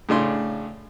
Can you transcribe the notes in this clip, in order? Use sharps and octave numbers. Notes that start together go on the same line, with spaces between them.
A2 C#3 D4 C6